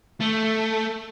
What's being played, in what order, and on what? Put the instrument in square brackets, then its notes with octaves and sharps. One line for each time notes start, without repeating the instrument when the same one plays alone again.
[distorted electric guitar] A3